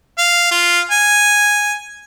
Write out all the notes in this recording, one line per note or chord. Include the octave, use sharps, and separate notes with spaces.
F5
F4
G#5